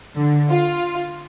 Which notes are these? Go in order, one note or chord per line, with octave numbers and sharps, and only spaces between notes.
D3
F4